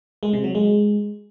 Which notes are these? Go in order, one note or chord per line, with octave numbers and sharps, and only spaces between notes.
G#3
C3
F#3
G#3